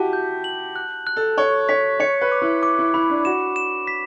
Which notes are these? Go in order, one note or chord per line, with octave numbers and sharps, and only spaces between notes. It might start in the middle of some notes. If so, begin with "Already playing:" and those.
Already playing: E4 F#4 G4 A5
G6
F#7
F#6
F#6
A4
C#5 C#6
C#5 B6
C#5 C#7
B4
D6
E4
D6
E4
E4 B5
D4
F#4 E7
E7
B6